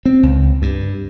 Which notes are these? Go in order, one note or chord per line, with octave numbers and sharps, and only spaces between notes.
C4
C#2
G2